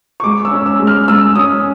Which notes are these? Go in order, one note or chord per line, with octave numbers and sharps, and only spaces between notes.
C#6
G#3 D6
E6
C#4
E6
G#3
F6
G#3 E6
C#4 D#6